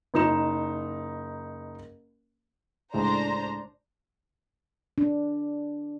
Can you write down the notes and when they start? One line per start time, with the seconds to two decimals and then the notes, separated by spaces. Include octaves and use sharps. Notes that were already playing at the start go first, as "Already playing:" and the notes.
0.14 F#1 D#4 E7
2.94 C#2 A2 G#3 D4 C5 A#5
4.98 D4